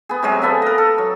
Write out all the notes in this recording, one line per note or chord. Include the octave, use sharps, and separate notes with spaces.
B3 G#4
C3 F#3 G#3 G#4
B3 A4 E5 F5
A#4 D#5
A4
F#3